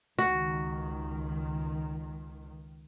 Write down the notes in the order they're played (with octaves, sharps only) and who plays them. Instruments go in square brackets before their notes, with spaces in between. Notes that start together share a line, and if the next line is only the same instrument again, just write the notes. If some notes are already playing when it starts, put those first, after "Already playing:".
[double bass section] C#2 D#3 [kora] F#4